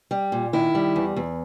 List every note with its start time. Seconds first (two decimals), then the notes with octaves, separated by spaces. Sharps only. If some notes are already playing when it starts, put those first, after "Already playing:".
0.11 G3
0.32 A#2
0.53 D#3 E4
0.75 G3
0.96 E2
1.16 E2